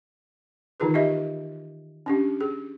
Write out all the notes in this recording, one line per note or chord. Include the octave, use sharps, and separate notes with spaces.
D#3 E3 D#4 F4 G#4 B4
G4 D#5 E5
C#4 D4 G4
G#4